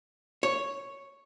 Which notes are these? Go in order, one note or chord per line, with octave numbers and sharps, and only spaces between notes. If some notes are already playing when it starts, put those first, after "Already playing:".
C#5